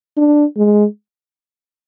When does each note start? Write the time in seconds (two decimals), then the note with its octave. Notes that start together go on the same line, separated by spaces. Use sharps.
0.17 D4
0.57 G#3